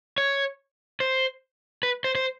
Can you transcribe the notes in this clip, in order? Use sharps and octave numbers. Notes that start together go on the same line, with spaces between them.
C#5
C5
B4
C5
C5